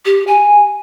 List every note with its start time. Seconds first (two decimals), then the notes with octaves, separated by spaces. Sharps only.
0.05 G4
0.27 G#5